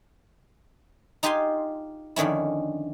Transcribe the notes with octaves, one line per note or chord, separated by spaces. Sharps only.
D#4 F4 G4 F5 G#5 C6
F2 D3 D#3 C#4 E4